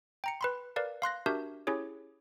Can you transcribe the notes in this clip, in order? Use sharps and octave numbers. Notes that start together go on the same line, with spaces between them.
G5 A#5 C#7
B4 B5 C6
A#4 B4 D5 F5
F5 C6 F#6 A#6
D4 F#4 G4 A#4 E5 G6
C#4 E4 G4 G#4 C#5